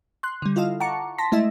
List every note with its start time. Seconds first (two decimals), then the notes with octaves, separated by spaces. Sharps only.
0.23 C6 F#6
0.42 D3 G3
0.56 E4 F4 A4 D#5 F5
0.80 F#5 A5 A#5 C#6 D6 C#7
1.18 A5 C6 A#6 B6
1.32 G#3 A3 E4 D#5 E5